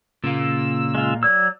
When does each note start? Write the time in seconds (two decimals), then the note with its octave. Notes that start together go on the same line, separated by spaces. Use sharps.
0.24 A#2 C#3 A#3 E6
0.95 G#3 F4
1.23 F#3 D5 E6 G#6